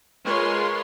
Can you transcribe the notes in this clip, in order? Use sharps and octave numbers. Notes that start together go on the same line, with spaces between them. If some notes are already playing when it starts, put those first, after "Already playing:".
G#3 F4 A#4 B4 C#5 C6